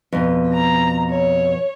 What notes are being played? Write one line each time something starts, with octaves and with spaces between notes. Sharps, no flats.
F2 B2
A#5
C#5